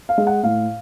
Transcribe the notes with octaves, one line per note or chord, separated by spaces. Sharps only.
F5
G#3
F#5
A2 F5